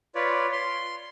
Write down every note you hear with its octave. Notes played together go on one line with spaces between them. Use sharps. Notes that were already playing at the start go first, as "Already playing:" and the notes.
F4 B4 C#5 D5
C6